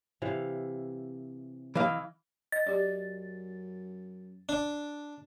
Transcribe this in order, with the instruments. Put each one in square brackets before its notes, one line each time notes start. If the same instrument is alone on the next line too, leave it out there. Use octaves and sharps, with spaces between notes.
[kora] C3 E3 F5
[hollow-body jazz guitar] E3 F5 [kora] E4 D#5
[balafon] D#5 [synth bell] A6
[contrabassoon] F#2 [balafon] G4 D5
[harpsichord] D4